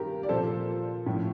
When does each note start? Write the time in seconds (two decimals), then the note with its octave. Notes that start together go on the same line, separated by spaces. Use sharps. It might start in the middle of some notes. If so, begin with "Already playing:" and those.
Already playing: G2 D#3 G4 A#4
0.23 D5
0.29 A#2 F3 A4 C5
1.06 A2 F3